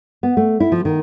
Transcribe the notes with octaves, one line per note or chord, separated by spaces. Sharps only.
B3
A3
E4
F3
D#3